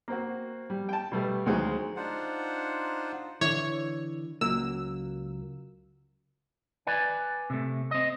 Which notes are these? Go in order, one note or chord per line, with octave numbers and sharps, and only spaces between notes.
A#3 C4 F#4
G3
G5 A5
B2 G3 A3 B3
D2 D#3 F#3 G#3 C4 F#4
D4 D#4 F4 C5 F#5
D3 E3 C#5
C#2 F#3 A#3 E6
B4 D5 G#5
C3 A3
C4 D#5